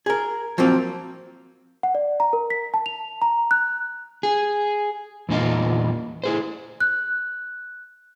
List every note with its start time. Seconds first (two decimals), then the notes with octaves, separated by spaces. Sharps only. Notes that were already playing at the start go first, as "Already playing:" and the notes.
0.06 G#4 A#4
0.58 F3 F#3 A#3 C4
1.83 F#5
1.95 D5
2.20 A#5
2.33 A#4
2.50 B6
2.74 A5
2.86 F7
3.22 A#5
3.51 F#6
4.23 G#4
5.29 E2 A#2 D#4 F5
6.24 E4 G#4 C5
6.80 F#6